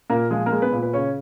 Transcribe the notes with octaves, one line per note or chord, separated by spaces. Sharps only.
A#2 A#3 A#4
F3 G#3 G#4
A#3 A#4
G#3
B3 B4
A#2
B4
C#3 C#4 C#5